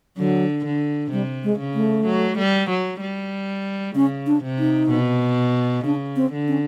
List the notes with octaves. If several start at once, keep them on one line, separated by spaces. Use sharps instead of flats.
D3 F#3
D3
C3 G3
G#3
C#3
A3
F#3
G3
F#3
G3
C#3 C#4
D4
C3
D#4
B2
C#3 D4
C4
D3
C#4